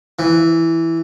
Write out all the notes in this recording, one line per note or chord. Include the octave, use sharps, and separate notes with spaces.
E3